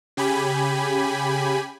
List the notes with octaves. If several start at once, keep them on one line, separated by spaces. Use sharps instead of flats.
C#3 G4 G#5 B5